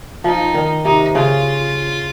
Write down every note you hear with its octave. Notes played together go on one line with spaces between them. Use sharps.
F3 D#4
D#3
C3 D#4
C#3 F4